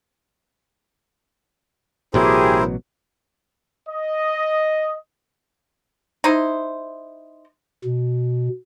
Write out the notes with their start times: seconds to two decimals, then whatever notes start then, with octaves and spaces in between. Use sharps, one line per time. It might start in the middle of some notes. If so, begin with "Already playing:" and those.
2.14 A1 B2 F#3 E4 G4 G#4 A#4 C5
3.88 D#5
6.24 D#4 E4 C5
7.85 B2